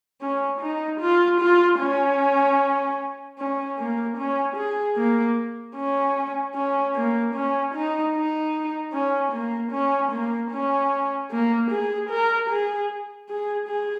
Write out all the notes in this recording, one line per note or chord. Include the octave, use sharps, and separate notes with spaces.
C#4
D#4
F4
F4
C#4
C#4
A#3
C#4
G#4
A#3
C#4
C#4
A#3
C#4
D#4
D#4
C#4
A#3
C#4
A#3
C#4
A#3
G#4
A#4
G#4
G#4
G#4